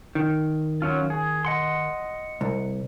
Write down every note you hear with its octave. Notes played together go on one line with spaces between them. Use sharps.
D#3
F#3 C#4 F4
G#4
D#5 F#5 C6
C2